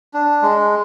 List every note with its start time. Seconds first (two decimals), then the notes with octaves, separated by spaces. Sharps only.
0.14 D4
0.42 G#3